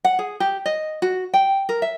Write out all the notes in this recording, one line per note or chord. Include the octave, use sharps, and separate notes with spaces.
F#5
G#4
G4
D#5
F#4
G5
A#4
E5